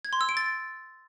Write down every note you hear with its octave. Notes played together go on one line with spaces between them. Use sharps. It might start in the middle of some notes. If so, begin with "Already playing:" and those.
G#6
C6
E6
D7
A6